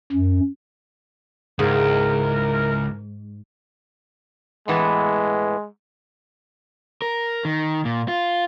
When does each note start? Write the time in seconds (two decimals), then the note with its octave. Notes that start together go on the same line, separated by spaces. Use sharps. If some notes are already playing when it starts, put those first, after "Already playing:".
0.12 F#2
1.59 C#2 G#2 E4 A#4
4.68 A2 E3 G#3 B3
7.02 A#4
7.45 D#3
7.85 A#2
8.08 F4